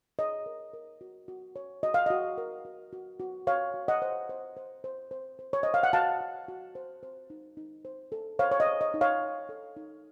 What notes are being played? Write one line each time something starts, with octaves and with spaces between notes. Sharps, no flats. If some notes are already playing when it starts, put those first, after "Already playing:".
C#5 D#5
A#4
A#4
F#4
F#4
C#5
F#4 D#5
F5
F#4 D#5
A#4
F#4
F#4
F#4
F#4 C#5 F5
F#4
D#5 F#5
C5
C5
C5
C5
C5
C5
C#5
C5 D#5
F5
F#5
F#4 F5 A5
F#4
F#4
C5
C5
D#4
D#4
C5
A4
C5 C#5 F5
C#5
D#5
C5
D#5
D#4
C#5 F5
D#4
A4
D#4